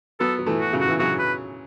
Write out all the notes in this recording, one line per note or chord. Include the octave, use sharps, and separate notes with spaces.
F#3 B3 A4
F#3
E3 A3
F#4
C#3 F#3
F#4
E3
C#3 F#3 F#4
B4